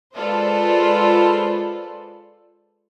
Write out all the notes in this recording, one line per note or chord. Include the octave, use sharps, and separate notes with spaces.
G#3 F4 A4 B4 C5 D5